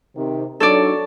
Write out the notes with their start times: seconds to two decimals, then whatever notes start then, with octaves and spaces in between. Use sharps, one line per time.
0.16 C3 D#3 G4
0.60 F#3 D4 D#4 A4 C#5 D5